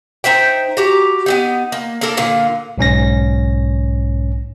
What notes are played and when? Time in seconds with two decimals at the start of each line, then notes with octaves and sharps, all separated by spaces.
0.24 D#4 C5 E5 G5
0.77 F#4 G4 A#5
1.26 B3 C4 D#4
1.72 A#3
2.01 A#3 D4 A4 A#4
2.17 A#2 D3 A#3 F5
2.78 B1 G#2 C#4 A#6